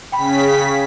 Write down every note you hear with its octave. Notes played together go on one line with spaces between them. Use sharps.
C#3 G5 B5 B6